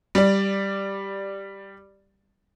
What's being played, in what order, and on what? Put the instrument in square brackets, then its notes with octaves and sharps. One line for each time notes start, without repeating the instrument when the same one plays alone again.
[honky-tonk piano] G3 D5